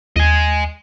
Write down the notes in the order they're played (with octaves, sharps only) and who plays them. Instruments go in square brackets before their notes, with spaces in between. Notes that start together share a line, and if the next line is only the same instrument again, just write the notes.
[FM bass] D#2 [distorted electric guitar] D#5 G#5